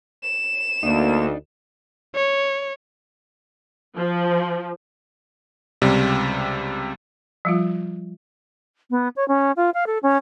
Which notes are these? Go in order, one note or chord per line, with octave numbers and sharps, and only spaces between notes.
E7
D2 A#3 D4 D#4
C#5
F3
C#2 C3 G3
F3 G3 F4
B3
C#5
C#4
F4
F5
A4
C#4